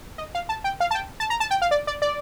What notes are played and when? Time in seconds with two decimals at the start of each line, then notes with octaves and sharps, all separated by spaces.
0.18 D#5
0.35 F5
0.49 A5
0.64 G5
0.80 F5
0.91 A5
0.95 G5
1.20 A5
1.30 A#5
1.40 A5
1.51 G5
1.62 F5
1.71 D5
1.87 D5
2.02 D5